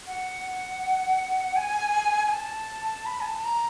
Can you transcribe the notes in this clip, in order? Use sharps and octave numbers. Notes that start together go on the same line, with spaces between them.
F#5
G#5
G#5
A5
B5
G#5
A5
A#5